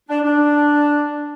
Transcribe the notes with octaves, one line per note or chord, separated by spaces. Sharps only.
D4
D4